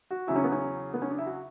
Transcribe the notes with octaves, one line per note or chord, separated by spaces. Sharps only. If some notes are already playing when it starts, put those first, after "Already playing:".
F#4
E2 C#3 F#3 E4
C#4
B3
C#4
B3
C#4
D4
E4
F#4